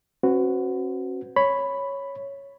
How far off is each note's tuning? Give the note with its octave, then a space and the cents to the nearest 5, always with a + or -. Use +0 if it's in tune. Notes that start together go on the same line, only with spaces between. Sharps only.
C#4 -45 F#4 +0 B4 +30
C#5 +0 B5 +5